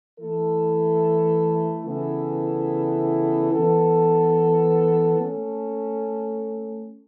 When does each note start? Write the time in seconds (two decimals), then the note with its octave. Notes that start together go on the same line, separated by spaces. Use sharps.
0.19 E3 A3 E4 A4
1.85 C#3 E3 B3 E4 A4
3.52 E3 B3 A4
5.19 A3 C#4 A4